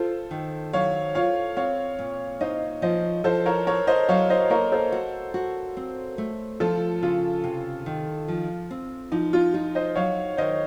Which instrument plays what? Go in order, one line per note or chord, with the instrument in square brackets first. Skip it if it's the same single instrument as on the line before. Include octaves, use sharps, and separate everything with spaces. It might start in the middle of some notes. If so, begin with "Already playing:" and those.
Already playing: [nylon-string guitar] F4 [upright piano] A4 C5
[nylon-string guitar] D#3
[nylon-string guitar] F#3 [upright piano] C#5 F5
[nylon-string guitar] F4 [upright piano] C#5 F5
[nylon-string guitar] C4 [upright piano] C#5 F5
[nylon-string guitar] A#2
[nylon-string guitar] D#4 [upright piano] C5 D#5
[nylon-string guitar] F3 [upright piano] C5 D#5
[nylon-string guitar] F3 [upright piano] A4 C5
[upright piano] A#4 C#5
[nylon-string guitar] A4 [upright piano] A#4 C#5
[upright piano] C5 D#5
[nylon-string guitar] F#3 [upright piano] C#5 F5
[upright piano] C5 D#5
[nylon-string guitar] A#3 [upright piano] A#4 C#5
[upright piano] A4 C5
[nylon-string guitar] F#4
F#4
C4
A3
[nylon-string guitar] F3 [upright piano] F4 A4
[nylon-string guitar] C#3 [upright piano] F4
[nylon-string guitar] C3
D#3
F3
C4
[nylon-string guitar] F3 [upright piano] D#4
[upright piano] F4
[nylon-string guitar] D#4 [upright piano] F4
[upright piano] C5 D#5
[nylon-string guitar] F#3 [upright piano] C#5 F5
[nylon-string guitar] D#3 [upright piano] C5 D#5